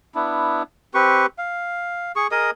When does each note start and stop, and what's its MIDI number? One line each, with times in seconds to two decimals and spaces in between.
0.15 0.63 59
0.15 0.63 62
0.15 0.63 64
0.94 1.26 60
0.94 1.26 67
0.94 1.26 71
0.94 1.26 85
1.38 2.12 77
2.16 2.27 68
2.16 2.27 85
2.32 2.51 68
2.32 2.51 70
2.32 2.51 75
2.32 2.51 87